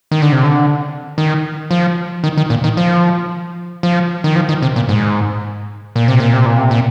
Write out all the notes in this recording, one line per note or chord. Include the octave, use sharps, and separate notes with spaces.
D#3
D3
C3
D3
D#3
F3
D#3
D#3
A#2
D#3
F3
F3
D#3
F3
D#3
C3
A#2
G#2
A#2
C3
A#2
C3
A#2
C3
A#2